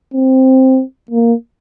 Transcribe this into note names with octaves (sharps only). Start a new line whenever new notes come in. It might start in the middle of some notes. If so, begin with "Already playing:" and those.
C4
A#3